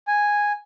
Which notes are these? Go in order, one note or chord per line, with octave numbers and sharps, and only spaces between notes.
G#5